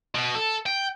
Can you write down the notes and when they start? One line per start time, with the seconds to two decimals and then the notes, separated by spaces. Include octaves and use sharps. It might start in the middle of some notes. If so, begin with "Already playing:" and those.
0.15 B2
0.35 A4
0.66 G5